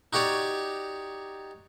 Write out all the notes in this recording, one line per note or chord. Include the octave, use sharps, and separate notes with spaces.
D#4 F#4 G4 C#5 D5